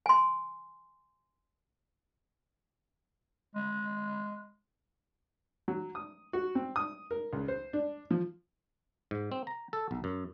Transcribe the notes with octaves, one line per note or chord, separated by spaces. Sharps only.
G#5 C6
G#3
F#3
D#6
F#4
C4
D#6
A#4
C#2
C5
D4
F3
G#2
C4
A#5
A4
B1
F#2